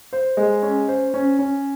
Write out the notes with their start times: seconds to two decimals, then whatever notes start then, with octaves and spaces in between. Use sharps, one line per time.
0.13 C5
0.37 G#3
0.63 C#4
0.88 C5
1.14 C#4
1.39 C#4